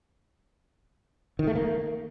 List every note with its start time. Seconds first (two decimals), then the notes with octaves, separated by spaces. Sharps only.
1.39 D#3
1.47 A3
1.55 A#3